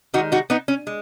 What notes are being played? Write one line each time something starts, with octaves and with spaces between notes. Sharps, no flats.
D#3 G#3 D#4 F#4
D#4 F#4
B3 D#4
C#4
G#3